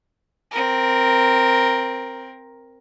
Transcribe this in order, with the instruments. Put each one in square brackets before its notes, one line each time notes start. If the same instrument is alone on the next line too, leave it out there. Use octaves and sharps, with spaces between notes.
[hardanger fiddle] C4 A#4